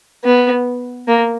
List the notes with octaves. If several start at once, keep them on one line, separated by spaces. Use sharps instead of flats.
B3
A#3